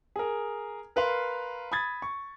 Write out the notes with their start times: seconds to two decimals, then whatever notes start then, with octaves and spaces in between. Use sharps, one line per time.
0.16 G#4 A#4
0.96 A#4 B4 F5 C6
1.72 B5 D#6 G#6 A6
2.02 C#6